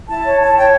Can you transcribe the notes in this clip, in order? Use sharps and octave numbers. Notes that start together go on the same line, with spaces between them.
E4 A5
C#5
E4 A5
C#5 G5